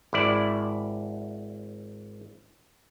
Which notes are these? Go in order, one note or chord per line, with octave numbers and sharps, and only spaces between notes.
G#1 E4 D5